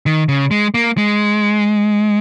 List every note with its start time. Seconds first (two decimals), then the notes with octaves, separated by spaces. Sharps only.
0.06 D#3
0.28 C#3
0.51 G#3
0.74 A#3
0.97 G#3